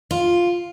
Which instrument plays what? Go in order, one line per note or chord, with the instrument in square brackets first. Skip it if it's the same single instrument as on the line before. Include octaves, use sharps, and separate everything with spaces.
[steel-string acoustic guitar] F4